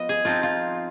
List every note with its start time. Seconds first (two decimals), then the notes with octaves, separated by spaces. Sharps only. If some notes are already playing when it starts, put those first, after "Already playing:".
Already playing: F3 B3 D#5
0.09 G#4
0.25 F3 C4 D#4 F4
0.43 F4